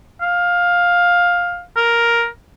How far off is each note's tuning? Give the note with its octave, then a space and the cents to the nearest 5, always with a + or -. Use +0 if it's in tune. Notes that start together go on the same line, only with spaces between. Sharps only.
F5 +15
A#4 +5